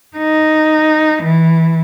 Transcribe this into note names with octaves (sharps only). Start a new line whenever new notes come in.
D#4
E3